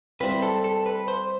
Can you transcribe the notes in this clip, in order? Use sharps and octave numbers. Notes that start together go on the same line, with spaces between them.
C3 G3 C4 E4 B4
A4
A4
B4
C5